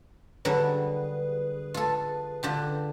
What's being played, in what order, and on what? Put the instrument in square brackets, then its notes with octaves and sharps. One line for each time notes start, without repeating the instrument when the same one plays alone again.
[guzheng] D3 F#3 G3 [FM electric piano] G#4 B4
[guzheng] F4 A4
D3 F4 G4